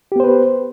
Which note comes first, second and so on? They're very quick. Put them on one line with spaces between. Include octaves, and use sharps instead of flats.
G4 B3 C5 B4